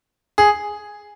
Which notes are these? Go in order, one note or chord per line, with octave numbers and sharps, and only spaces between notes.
G#4